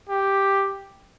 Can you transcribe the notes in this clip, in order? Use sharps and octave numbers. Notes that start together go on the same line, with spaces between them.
G4